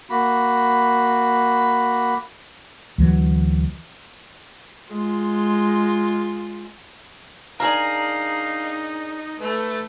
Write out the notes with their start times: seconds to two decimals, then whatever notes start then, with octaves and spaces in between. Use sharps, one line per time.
0.10 A#3 F#4 B5
2.98 D2 E3 F#3
4.90 G#3 F4
7.60 D4 D#4 G#4 A#4 F5 A#5 F6
9.40 A3 B4